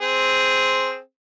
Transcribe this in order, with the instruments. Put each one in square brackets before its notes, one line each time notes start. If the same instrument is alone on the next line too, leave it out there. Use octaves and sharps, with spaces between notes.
[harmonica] C4 G#4